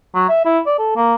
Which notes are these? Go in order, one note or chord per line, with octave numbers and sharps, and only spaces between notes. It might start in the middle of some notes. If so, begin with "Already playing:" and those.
F#3
E5
E4
D5
A4
A#3